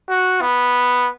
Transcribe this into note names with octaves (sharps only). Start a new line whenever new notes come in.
F#4
B3